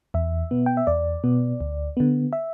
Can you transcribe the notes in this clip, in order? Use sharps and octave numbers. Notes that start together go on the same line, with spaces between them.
E2 E5
B2 B3
G5
E5
E2 D5
B2 B3
D2
D3 B3
E5